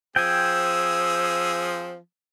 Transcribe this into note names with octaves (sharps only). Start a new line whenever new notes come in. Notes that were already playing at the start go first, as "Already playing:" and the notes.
F3 C4 G#4 G5 G#5 E6